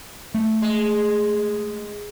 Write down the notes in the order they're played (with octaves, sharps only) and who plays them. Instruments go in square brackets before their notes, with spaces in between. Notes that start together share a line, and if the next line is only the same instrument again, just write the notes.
[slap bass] A3
[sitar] G#3